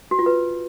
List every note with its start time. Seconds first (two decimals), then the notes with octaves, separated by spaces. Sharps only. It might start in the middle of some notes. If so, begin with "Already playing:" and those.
0.11 F#4
0.19 F4
0.26 B4